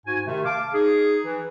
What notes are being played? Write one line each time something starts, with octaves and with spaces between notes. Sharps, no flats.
G#2 F#4 G#5
C3 D#3 A3
F5 A5 D6
D#4 G#4
E3